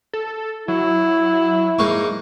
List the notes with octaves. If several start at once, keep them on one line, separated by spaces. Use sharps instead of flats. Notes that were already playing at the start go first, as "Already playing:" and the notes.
A4
F#3 E4
G#2 A#3 C#6